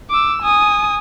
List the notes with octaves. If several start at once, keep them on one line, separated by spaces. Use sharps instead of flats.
D6 E6
G#5 D#6